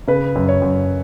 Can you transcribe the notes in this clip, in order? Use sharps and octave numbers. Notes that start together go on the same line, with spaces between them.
C#3 B4
F#2
C#5
F#2